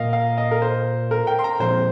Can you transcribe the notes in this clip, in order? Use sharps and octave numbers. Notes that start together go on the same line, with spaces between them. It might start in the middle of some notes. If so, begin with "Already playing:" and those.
Already playing: A#2 A#3 A#4 D#5 F5
F5
D#5
A#4
C5
A#4
G5
C6
A#5
A#2 F3 C4 C5